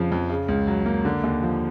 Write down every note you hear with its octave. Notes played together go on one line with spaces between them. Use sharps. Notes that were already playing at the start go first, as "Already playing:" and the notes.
Already playing: F2 C#3 F3
F2
C#3
C#2
F#3
A#3
D3
D#2
F3